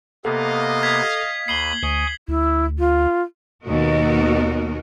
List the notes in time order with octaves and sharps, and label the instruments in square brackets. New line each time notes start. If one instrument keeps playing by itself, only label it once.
[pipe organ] C3 A#3 B3 [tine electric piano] A4 [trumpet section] D#5 F5
[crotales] G#6 B6
[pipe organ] D#2 B5 D#6 [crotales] C7 F#7 G7
[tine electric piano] D2 [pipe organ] G#5 C#6 D#6
[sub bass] D2 [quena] E4
[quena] F4
[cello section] D#2 B2 B3 F#4 A#4 D#5